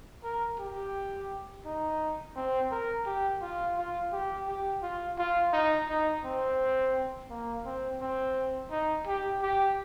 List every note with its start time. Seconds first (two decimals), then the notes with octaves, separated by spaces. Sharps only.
0.24 A#4
0.59 G4
1.65 D#4
2.36 C4
2.71 A#4
3.06 G4
3.41 F4
3.77 F4
4.12 G4
4.47 G4
4.83 F4
5.18 F4
5.53 D#4
5.89 D#4
6.25 C4
7.30 A#3
7.65 C4
8.01 C4
8.71 D#4
9.07 G4
9.42 G4